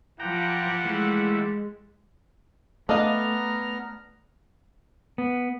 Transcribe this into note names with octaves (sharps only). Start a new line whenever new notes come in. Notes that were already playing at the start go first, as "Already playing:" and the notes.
F3 G3 A#3 F#5 G5 A#5
E3 G#3 A3
A3 B3 D4 D#5 F5 A#5 F6
B3